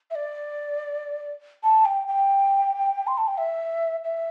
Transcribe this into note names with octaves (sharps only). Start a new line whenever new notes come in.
E5
D5
A5
G5
G5
C6
A5
G5
E5
E5